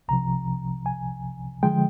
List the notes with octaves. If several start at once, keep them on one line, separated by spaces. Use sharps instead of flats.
C2 C3 F3 A#5
G#5
D3 F3 G#3 G5